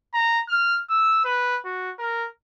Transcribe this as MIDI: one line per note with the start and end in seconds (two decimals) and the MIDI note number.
0.14 0.42 82
0.48 0.81 89
0.89 1.20 88
1.25 1.59 71
1.65 1.92 66
1.99 2.27 70